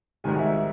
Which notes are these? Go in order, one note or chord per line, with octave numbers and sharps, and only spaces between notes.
G#1 G#2 D#3 G3 G#5
E5